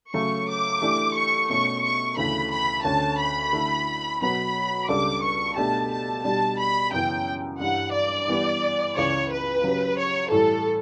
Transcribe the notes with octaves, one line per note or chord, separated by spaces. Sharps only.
C#3 F#3 A3 C#6
D6
E3 A3 D4 G4
C#6
B2 A3 C#4 C#6
C#6
D2 C#3 E3 A3 B5
B5
D2 D3 A3 C#4 A5
B5
D3 A3 E4 A4
B2 F#3 B3 F#4 B5
C#2 C#3 G3 D4 A4 D6
C#6
B2 A3 D4 G4 A5
A5
B2 G3 D4 G4 A5
B5
F#2 C#3 E3 B3 G5
G2 E3 G3 F#5
D5
E3 G3 B3
C#2 C#3 E3 C#5
B4
C#3 F#3 C#4 G4
C#5
A2 E3 G3 A4